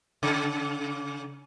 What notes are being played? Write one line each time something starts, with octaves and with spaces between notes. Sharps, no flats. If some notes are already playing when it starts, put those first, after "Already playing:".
C#3